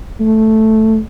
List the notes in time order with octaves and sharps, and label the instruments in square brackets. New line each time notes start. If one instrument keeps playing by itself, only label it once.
[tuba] A3